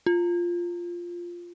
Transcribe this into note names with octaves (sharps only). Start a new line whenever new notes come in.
F4